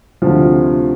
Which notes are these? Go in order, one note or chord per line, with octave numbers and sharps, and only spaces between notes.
D2 C3 F3